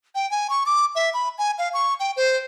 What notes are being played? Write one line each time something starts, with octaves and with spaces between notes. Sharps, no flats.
G5
G#5
C#6
D6
E5
B5
G#5
F5
C#6
G5
C5